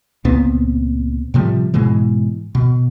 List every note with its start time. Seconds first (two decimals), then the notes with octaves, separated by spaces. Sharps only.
0.25 C#2 A#2 B3 C4
1.34 A2 C3 F3 G3
1.74 G#2 B2 E3 G#3
2.55 B2